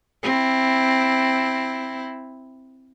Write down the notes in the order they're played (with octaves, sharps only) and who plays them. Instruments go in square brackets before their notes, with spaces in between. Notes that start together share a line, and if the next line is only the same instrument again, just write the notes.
[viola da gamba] C4 E4